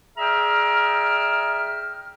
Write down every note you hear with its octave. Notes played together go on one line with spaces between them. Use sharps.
G#4 D5 E5 G5 A#5 F6